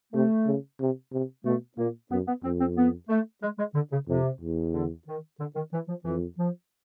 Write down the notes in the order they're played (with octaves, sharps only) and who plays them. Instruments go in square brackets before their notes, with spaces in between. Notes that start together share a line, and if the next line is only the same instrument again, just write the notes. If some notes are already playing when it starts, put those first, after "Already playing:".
[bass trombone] C3 [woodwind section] A3
[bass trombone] C#3
C3
C3
[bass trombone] B2 [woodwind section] A3
[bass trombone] A#2 [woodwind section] A#3
[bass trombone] F#2 [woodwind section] B3
[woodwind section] B3
[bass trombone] F2 [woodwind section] C4
[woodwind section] C4
B3
A3
G#3
G#3
D3
C#3
[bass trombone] F2 [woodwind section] C3
[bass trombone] E2
[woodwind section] D3
D#3
D3
D#3
E3
F3
[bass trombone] F2 [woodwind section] E3
[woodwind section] F3